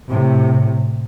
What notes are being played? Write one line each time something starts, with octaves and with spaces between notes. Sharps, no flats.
A2 C3